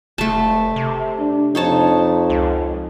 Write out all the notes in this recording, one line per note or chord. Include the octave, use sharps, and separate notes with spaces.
F1 A3 A5
C3
D4
F2 D#4 C#5 A5
C#2